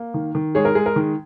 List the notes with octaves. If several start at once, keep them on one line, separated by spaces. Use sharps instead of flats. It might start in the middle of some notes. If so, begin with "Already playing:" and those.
Already playing: A#3
D#3
D#3
G#3 G#4 C#5
A#4
G#3 G#4
A#4
D#3